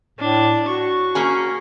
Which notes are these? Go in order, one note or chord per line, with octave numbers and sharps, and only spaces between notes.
A2 D4
F#4 C#6
A#3 C#4 G#4